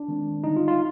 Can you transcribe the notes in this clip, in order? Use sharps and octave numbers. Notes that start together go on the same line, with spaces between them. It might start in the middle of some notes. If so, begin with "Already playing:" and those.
Already playing: D4
D#3 G#3 C4
D3 G3 C4 D#4
F4
F4